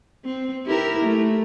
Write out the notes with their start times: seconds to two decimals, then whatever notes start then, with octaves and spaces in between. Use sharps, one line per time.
0.25 C4
0.66 E4 G4 A#4
1.04 A3